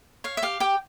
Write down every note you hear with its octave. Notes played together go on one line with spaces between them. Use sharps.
C#5 F5
E5
G4 F5
G4 G5